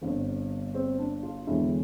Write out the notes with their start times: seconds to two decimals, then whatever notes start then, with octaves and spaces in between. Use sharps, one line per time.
0.01 G1 G2 D3 C4
0.74 C4
0.99 D4
1.23 F4
1.47 E1 E2 D3 E4